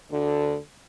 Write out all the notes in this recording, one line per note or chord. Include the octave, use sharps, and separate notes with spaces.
D2 D3